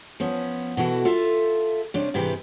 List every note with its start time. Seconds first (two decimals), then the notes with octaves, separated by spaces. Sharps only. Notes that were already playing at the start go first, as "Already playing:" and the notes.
0.20 F3 B3 C#4
0.77 B2 E3 F#4 A4
1.05 F4 A4 E5
1.94 C3 C#4 D4
2.14 G#2 C3 E3 G4 B4